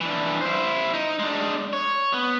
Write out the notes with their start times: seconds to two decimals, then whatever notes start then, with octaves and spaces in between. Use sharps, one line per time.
0.01 E3 D4
0.41 E4 C5
0.94 D#4
1.19 G#3 D4
1.73 C#5
2.13 B3